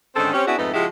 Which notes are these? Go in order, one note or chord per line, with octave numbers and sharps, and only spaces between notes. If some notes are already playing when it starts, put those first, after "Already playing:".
G#2 D3 D#3 C4 C#4 A4
C4 C#4 G4
B3 C#4 D4 E4 F#4 G#4
F2 G#2 A3 B3 D#4
C#3 F3 G#3 E4 F#4 G4